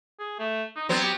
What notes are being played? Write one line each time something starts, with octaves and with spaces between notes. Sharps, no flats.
G#4
A3
D#4
F#3 B3 C4
G4